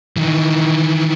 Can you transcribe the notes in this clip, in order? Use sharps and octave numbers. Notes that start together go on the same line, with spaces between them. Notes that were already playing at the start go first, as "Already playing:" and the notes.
D#3 E3